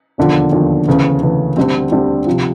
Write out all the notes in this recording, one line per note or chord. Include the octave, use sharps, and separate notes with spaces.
E1 D#2 D3 F3
E1 D#2 D3 F3
D2 C#3 E3
D2 C#3 E3
D2 D3 G3 C4
D2 D3 G3 C4
C3 F3